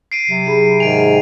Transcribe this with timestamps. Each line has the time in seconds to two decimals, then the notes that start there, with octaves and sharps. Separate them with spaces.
0.12 C7 D7 D#7
0.29 C3 F#3
0.46 D#4 G#4 B5
0.80 G#2 D#3 G#5 D7 F7